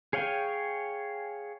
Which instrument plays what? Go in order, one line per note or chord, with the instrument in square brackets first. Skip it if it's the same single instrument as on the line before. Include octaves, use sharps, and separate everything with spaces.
[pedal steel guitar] G#4 C#5 F5 G5 G#5